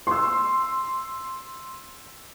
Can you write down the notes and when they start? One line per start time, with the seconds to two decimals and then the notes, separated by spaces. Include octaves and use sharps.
0.07 C6 E6